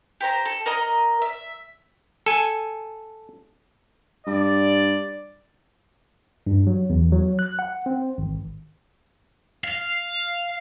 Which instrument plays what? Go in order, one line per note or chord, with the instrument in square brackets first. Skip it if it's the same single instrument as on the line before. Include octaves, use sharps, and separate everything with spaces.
[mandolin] G4 C5 A#5
A4
A#4 D#5 A#5
E5
[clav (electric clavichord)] A4 G#5
[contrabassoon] G2 [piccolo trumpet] D5
[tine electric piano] G2
F#3
E2
F#3
F#6
F#5
C4
G#1
[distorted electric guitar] F5